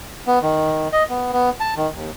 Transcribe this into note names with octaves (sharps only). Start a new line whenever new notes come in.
B3
D#3
D#5
B3
B3
A5
D#3
D#2